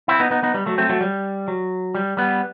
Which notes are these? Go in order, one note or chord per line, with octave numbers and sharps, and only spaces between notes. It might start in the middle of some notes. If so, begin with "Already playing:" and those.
C4 E4
B3 D#4
B3 D#4
B3 D#4
G3
F#3 A3
A3 C4
F#3 A3
G3
F#3
G3
G3 B3